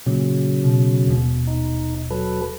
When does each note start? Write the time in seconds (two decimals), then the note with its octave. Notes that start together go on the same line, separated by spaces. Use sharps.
0.06 A#2 C#3 F#3
0.64 B2
1.07 D#1 B2
1.47 D#4
2.11 F#3 A4 B4